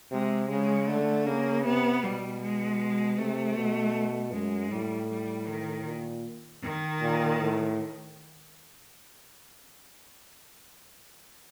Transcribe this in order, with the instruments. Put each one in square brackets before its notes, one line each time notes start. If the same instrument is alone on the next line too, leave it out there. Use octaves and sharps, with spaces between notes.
[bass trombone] C3 [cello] G#3
[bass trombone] C#3 [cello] G#3
[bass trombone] D3 [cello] A3
[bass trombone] C#3 [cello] A#3
[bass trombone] C3 [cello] B3
[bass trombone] B2 [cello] G3
[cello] G#3
[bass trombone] C3 [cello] A3
[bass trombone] B2
[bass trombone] F#2 [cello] G#3
[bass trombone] A2 [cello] G3
[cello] G3
D#3
[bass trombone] A#2
[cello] D#3
[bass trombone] A#2
A2